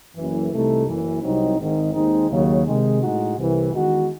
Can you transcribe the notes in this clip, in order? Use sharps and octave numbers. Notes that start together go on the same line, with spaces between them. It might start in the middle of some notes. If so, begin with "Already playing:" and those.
F#1 F#2 E3
C2 C3 E3 A3 D#4
F#1 F#2 E3
C2 C3 F#3 C4 D#4
G#1 G#2 D#3
D#2 D#3 G#3 C4 D#4
D#2 C#3 F#3
C3 D#3 G#3
A2 G#3 D#4 F#4
C2 C3 E3
E2 D#3 G#3 D#4 F#4